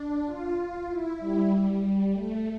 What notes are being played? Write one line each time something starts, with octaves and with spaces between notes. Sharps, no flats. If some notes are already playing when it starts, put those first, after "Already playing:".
Already playing: D4
F4
E4
G3
A3